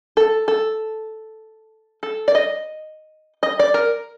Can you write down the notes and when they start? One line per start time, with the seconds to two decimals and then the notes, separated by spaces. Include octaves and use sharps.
0.17 A4
0.48 A4
2.03 A4
2.28 D5
2.35 D#5
3.43 D#5
3.59 D5
3.74 A#4